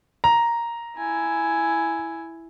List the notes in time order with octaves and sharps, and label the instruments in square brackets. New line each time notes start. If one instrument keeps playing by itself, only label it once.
[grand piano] A#5
[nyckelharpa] E4 G#5